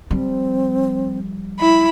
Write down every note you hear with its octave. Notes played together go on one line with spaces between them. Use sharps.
F3 G3 C4
E4 B5